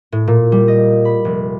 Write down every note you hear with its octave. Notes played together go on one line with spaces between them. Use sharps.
A2
A#2
G3
D#5
B5
F1